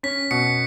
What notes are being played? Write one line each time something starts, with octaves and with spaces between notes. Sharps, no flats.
C#4 B6
B2 C#7